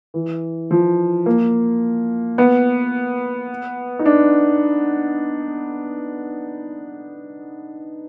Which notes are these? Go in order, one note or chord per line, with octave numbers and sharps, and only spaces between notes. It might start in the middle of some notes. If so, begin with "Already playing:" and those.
E3
F3
A#3
B3
D#4
D4